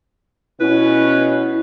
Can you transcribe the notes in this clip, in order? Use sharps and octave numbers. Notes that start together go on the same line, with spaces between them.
B2 C#4 E4 B4